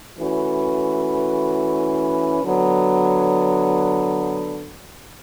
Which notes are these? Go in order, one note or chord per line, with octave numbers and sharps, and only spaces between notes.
E3 A3 C#4 F#4 B4
D3 F#3 B3